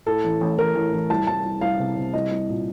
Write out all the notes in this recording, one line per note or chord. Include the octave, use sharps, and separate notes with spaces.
A2 A4
A1
A1
A1 A#4
A1
A1
C2 A5
C2 A5
C2
C2 F5
C3
C3
C2 D#5
C2
A#2